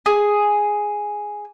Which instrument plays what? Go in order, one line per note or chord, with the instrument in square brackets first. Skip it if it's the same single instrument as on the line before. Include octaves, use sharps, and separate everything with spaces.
[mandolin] G#4